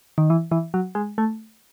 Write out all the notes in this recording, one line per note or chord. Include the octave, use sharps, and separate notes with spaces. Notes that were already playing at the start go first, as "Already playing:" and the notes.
D#3
E3
E3
F#3
G#3
A3